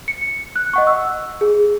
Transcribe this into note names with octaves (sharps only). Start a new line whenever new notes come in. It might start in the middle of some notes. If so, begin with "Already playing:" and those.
C#7
F#6
D#5 F#5 C#6
E6
G#4